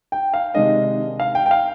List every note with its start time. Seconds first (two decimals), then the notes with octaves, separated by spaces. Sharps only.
0.12 G5
0.34 F5
0.55 C3 D#3 G#3 D4 D#5
1.20 F5
1.35 G5
1.46 G5
1.51 F5